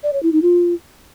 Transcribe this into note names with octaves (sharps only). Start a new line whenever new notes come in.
D5
C#5
E4
D#4
F4